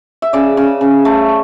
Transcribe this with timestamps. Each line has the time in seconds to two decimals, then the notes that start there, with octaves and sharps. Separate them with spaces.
0.22 E5
0.33 C#3 D5
0.57 C#3
0.81 C#3
1.05 A3